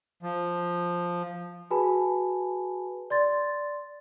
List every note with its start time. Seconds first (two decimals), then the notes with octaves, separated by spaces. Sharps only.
0.23 F3
1.71 F#4 G#4 B4 G#5 A5 B5
3.10 D5 C6 A6